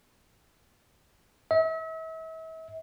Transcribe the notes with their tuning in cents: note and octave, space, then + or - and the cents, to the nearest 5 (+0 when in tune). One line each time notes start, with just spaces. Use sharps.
E5 -40